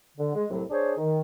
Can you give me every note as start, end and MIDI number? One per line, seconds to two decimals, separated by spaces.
0.17 0.33 50
0.35 0.45 56
0.51 0.63 36
0.51 0.63 45
0.51 0.63 54
0.70 0.93 62
0.70 0.93 68
0.70 0.93 72
0.70 0.93 73
0.98 1.20 51